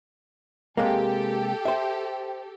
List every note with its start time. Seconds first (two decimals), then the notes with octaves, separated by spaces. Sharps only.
0.77 C3 G#3 A#3 G4 A4
1.65 C5 E5